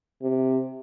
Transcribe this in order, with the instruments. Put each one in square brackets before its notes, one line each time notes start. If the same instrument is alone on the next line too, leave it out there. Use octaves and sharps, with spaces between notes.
[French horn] C3